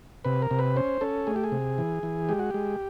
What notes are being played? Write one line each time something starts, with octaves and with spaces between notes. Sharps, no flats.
C3 B4
A#4
C3
B4
C#4 C5
C#4 A4
A3 G#4
G4
G#4
C3
E3
E3
G#3 G4
F#4
G#3 G4